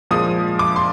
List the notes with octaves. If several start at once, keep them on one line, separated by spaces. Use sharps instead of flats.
A#2 F3 G#3 D#6
D6
C6